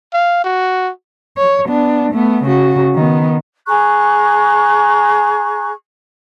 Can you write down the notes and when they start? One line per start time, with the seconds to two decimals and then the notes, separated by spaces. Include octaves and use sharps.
0.13 F5
0.44 F#4
1.37 C#5
1.67 B3 D4
2.12 A3 B3
2.44 C#3 F#4
2.94 D#3 B3
3.67 G#4 A#5 C#6 F#6